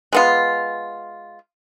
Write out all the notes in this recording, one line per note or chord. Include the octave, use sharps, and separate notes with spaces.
G#3 B3 F4